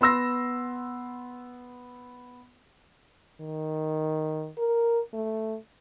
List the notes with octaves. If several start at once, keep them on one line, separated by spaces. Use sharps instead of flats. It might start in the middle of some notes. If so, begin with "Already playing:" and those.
B3 C6 E6 A#6
D#3
A#4
A3